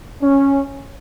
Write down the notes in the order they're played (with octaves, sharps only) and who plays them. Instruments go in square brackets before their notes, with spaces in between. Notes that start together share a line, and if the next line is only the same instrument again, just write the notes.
[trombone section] C#4